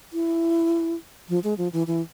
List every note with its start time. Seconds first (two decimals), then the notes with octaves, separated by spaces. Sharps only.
0.13 E4
1.29 F3
1.44 G#3
1.58 F3
1.73 E3
1.87 E3